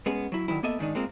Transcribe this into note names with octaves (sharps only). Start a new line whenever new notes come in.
G#3 B3 C#4 G#4
F#3 E4
D3 D#3 F#3 E4
A#3 B3 A4 D#5 E5
G#2 D#3 D4 D#4
G#3 A#3 C4 F4